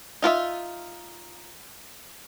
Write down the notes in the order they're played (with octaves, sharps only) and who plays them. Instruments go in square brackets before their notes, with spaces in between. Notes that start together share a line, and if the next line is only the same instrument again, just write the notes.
[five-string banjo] D#4 F4 F#4 E5